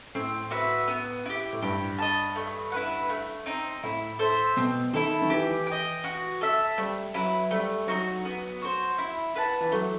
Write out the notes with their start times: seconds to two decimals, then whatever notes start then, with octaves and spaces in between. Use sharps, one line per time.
0.15 A2 C4
0.51 F#4 B4 E5
0.88 B3
1.26 E4 G4
1.53 A2
1.62 G2 G4
1.99 D#5 A5
2.36 A3
2.72 E4 B4 F#5
3.09 A3
3.46 C4 D#4
3.83 A2 E4
4.19 A4 C5 E5
4.57 B2 C4
4.93 D#3 E4 A4
5.22 D#3
5.30 E3 G4
5.66 G5
5.71 D#5
6.04 F#4
6.41 A4 E5
6.78 G3 A3
7.14 F#3 E4 B4
7.51 G3 A3
7.87 F#3 D#4 F#4
8.25 B3
8.62 F#4 C5
8.98 E4
9.36 B4 F#5 A5
9.61 E3
9.72 F#3 A3